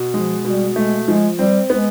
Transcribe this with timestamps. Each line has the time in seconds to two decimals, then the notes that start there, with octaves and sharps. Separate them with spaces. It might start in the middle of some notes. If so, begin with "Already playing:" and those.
Already playing: B2
0.14 F3 G#3
0.44 B2 G3
0.76 G#3 A3
1.07 F3 G#3
1.39 G3 C4
1.70 G#3 B3